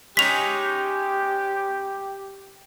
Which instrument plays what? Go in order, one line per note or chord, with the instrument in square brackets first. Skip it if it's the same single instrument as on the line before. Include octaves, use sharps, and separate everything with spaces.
[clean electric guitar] G#3 C#4 D#4 [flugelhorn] G4 [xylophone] B6 F7